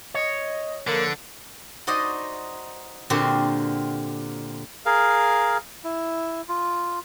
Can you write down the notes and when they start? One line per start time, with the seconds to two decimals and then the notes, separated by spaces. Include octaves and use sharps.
0.14 C#5 D#5
0.87 D3 F3 A#3 A4 B4
1.87 D#4 F#4 C5 D5 D#5
3.10 A#2 D3 C4 F#4 G4 A#4
4.86 G#4 A#4 F5
5.84 E4
6.49 F4